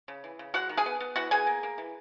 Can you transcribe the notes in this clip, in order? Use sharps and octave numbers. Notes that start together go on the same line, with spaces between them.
C#3
E3
C#3
G#3 F#4 F#5
D#3
G#4 G#5
B3
B3
E3 F#4 F#5
B3 G#4 G#5
A#3
A#3
E3